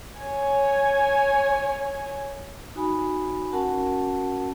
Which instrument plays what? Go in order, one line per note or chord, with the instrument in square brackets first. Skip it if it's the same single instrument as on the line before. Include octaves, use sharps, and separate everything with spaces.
[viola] C#5 G#5
[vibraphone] D#4 F#4 G#5 B5
C#4 F#4 A#4 F#5 A5